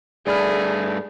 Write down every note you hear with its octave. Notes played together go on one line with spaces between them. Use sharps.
G2 A3 G#4 D5 B5 F6